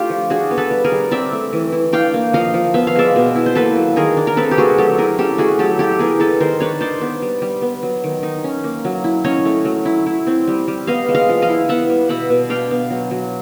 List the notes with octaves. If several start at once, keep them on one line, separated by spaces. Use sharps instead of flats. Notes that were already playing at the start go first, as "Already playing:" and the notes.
Already playing: A3 D4 F4 G4
F3
D4 F#4 G#4
B3
A4 B4
G3
G#4 A#4
G3
C4 D5 E5
A3
E3
E4
D4 F5 G5
A#3
F3 D#5 F5
F3
B3 E5
F5
G#3 D5 E5
B2
E4
C5
A#3 A4 B4
F#3
D#3 G#4 A#4
D4
A#4
C4 A4 B4
G4
A3 F#4 G#4
F#3 G4 A4
E4 G#4 A#4
C#4 G4 A4
A3 F#4 G#4
F#3 G4 A4
E4 G4 A4
B3 G#4 A#4
G#3 A4 B4
D#3 A#4 C5
D4 B4 C#5
D#4 C5 D5
B3
G3
G3
B3
F#3
D#3
D#4
C#4
A#3
F#3
E4
C#4 C#5 D#5
A3
F#3
E4
E4
C4
G3
G3
B3 D#5 F5
G#3
D#5 F5
F3
D#5 F5
E4
B3 E5 F#5
G3
B2 E5 F#5
B2
D4 F5 G5
B3
F#3
F#3